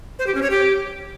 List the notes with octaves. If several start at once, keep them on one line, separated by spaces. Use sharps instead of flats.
C5
G4
C#4
C#5
G4